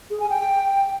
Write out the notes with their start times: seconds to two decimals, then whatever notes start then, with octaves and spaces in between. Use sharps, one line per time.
0.10 G#4
0.20 G#5
0.30 G5